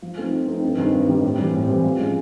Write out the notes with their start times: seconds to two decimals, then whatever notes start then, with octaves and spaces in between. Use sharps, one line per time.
0.02 F3
0.17 A3 C4 D#4
0.33 F3
0.48 A3 C4 D#4
0.63 G2
0.78 D#3 G3 C4
0.93 G2
1.08 D#3 G3 C4
1.23 A2
1.39 E3 G3 C4
1.54 A2
1.68 E3 G3 C4
1.84 F3
1.99 G#3 C#4